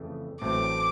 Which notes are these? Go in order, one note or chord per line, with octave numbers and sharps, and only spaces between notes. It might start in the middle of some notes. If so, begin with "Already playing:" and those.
Already playing: F2 C#3 E3 A3
A1 A2 F#3 A3 C4 D6